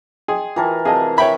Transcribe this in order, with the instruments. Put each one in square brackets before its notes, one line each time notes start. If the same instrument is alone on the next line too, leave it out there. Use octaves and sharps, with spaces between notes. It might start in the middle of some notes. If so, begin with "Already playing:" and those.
[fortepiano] G#4 [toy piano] D#5 G5 C6
[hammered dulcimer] E3 A#4 A5 [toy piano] F4 G5 D6
[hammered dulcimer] C3 [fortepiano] G#4 D#5 [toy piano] F5 A5
[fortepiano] C#5 G5 B5 [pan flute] E5